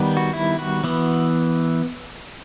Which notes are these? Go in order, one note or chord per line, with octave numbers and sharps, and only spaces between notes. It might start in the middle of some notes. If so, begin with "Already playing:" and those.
Already playing: D#3 G3 B3
F#4
E4
F#4
E3 B3